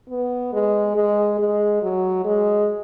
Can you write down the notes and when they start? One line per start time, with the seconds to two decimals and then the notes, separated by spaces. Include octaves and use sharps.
0.10 B3
0.53 G#3
0.96 G#3
1.39 G#3
1.83 F#3
2.25 G#3